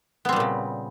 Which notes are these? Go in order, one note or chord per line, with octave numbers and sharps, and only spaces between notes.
A#2 C#3 G3 B3 C4